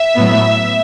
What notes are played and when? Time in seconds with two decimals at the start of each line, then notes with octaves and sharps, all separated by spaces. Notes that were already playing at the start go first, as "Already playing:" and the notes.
Already playing: E5
0.16 A2 F#3 B3